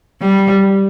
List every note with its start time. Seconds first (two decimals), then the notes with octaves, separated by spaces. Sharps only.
0.21 G3